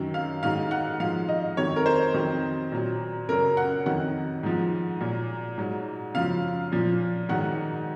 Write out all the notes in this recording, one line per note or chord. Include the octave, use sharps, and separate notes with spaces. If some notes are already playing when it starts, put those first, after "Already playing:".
Already playing: F#2 D#3 F#3
F5
G#2 D#3 F#3 F5
F#5
G#2 F3 F5
D#5
F2 D#3 F#3 C#5
A#4
C5
F2 D#3 F#3
A#2 F#3
F#2 C#3 F#3 A#4
F#5
F2 D#3 F#3 F#5
G#2 F3
A#2 F#3
G#2 F#3
F#2 C#3 F3 F5
A#2 F3
G#2 D#3 F#3 F#5